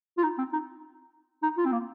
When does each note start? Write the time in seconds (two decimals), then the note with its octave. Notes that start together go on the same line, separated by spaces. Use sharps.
0.18 F4
0.23 D#4
0.38 C4
0.53 D#4
1.43 D#4
1.57 F4
1.66 C4
1.72 A#3